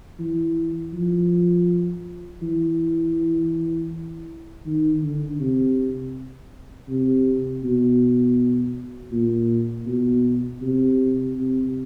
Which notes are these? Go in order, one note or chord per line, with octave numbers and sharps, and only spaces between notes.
E3
F3
E3
D#3
D3
C3
C3
B2
A#2
B2
C3
C3